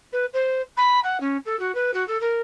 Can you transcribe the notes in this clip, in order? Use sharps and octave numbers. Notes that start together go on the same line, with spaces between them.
B4
C5
B5
F#5
C#4
A4
F#4
B4
F#4
A4
A#4